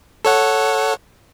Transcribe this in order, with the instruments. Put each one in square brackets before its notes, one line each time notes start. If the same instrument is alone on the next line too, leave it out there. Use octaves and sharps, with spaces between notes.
[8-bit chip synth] A4 C#5 F#5